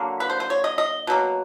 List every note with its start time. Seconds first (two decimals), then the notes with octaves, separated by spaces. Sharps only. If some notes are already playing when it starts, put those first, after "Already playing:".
Already playing: D3 F#3 A#3
0.20 B4
0.30 C5
0.40 C5
0.50 C#5
0.64 D#5
0.78 D#5
1.07 B2 F#3 A#3